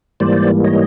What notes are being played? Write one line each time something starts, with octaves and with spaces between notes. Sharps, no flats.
G#2 E3 G3 A#3 C5 D5
C#5 D#5